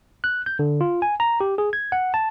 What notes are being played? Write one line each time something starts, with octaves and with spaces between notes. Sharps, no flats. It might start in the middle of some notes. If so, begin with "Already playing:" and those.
F#6
G6
D3
F4
G#5
A#5
G4
G#4
G#6
F#5
A5